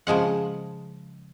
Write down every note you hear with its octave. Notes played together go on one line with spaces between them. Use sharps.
C#3 F3 G#3 F#5